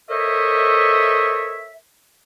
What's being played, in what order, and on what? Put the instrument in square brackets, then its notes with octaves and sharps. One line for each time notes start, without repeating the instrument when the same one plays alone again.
[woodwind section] A4 A#4 C5 C#5 D#5 E5